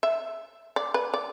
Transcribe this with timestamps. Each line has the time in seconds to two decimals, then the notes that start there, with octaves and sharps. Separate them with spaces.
0.03 E5
0.76 D5
0.94 B4
1.14 D5